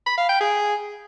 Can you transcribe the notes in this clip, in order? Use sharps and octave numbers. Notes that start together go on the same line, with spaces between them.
B5
F5
G5
G#4